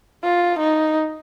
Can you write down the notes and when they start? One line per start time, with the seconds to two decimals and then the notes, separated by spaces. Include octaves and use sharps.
0.24 F4
0.59 D#4